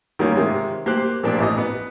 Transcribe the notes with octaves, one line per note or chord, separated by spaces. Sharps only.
D#3 G3 A#3 C#4 F4
C3 D#3 G#3
A#3 G4 C5 F#6
A#2 F3 C4 D4 G4
A1 D#5
B3